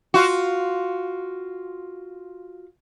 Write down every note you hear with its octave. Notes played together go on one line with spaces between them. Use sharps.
F4 F#4